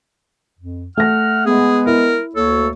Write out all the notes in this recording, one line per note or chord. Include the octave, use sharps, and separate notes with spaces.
F2
A3 F#5 F6 A#6
G#3 B3 G#4
E4 A#4
D2 A#3 A4 C#5